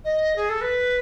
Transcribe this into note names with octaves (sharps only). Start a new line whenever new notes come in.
D#5
G#4
A4
B4